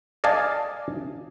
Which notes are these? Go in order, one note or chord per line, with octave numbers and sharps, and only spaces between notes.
D5 D#5 F5 G#5 A5